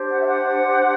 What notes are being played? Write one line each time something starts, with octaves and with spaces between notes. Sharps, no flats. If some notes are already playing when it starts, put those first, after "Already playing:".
Already playing: D4 G4 C5
F#5
E5
F#5